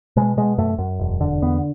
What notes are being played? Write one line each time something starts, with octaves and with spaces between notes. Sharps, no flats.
B2 G#3
B2 G#3
F#2 A3
F#2
E1
D3
E2 B3